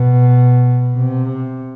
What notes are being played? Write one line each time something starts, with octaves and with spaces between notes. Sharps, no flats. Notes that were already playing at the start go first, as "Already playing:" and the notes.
Already playing: B2
C3